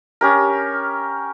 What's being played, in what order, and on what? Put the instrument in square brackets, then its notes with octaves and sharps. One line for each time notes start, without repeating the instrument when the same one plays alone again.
[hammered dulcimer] C#4 G4 A#4